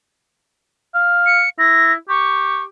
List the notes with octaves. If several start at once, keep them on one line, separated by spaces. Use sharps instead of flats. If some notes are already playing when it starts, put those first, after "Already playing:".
F5
C#7
E4 A#6
G4 C#6